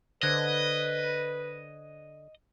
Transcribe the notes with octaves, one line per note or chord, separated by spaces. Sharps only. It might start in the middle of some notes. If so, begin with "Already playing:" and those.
D3 B4 C5 D#5 F#6 G#6